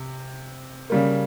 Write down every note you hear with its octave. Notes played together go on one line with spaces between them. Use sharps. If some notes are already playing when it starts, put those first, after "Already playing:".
Already playing: C3
C#3 G3 A#3